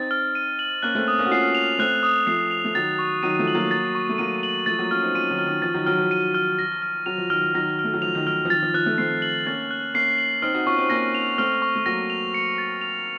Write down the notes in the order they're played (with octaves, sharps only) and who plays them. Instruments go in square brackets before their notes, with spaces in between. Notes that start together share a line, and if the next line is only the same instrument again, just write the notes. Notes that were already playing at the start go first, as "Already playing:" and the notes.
Already playing: [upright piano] C4 D#4 [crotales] A6
[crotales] F6
D#7
F#7
[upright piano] A#3 C#4 [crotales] F#6
[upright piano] A3 C4
[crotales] D#6
[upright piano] A#3 C#4
F#4
[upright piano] C#4 F4 [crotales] C7
[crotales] F7
[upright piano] A3 C4 [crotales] F#6
[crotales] D#6
[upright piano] F3 A3 [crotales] C7
[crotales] F7
[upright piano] A3
[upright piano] D#3 F#3 [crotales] A6
[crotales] C#6
[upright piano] D#3 F#3 [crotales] D#7
[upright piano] F3 A3
[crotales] F#7
[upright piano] F#3 A#3
[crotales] A6
C#6
[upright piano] A3
[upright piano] F#3 A#3 [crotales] D#7
[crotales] F#7
[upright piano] F3 A3 [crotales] A6
[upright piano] F#3 A#3
[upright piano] C#4 F4 [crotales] F6
[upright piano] C4 D#4
[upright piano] C#4 F4 [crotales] D#7
[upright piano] D#3 F#3
[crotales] F6
[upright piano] D#3
[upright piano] F3 [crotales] A6
[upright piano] D#3 F#3
[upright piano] D#3 F#3 [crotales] F6
[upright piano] F3
[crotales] D#7
F6
A#6
F6
[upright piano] F#3 [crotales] F7
[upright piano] F3
[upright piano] D#3 [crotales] F6
[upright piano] F3
[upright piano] D#3 F#3 [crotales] A#6
[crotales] F6
[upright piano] A3
F#3
[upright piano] F3 [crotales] F7
[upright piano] D#3
[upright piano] D#3 [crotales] F6
[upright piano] F3
[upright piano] D#3 [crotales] A6
[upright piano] F3
[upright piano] F3 [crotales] F#6
[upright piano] F3 A3
[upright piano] A3 C4 [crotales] C7
[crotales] F#7
[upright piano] A#3 C#4 [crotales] A6
[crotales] F#6
[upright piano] A#3 C#4 [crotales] C7
[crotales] F#7
[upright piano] C4 D#4 [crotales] F6
[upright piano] D#4 F#4
[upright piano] C#4 F4 [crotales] C#6
[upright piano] C4 D#4
[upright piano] A#3 C#4 [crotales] A#6
[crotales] F7
[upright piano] A3 C4 [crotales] F6
[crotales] C#6
[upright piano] A3
[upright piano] F#3 A#3 [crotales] A#6
[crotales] F7
C#7
A6
F7